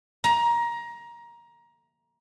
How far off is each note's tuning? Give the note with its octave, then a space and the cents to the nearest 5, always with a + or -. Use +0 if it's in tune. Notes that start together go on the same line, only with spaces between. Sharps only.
A#5 +20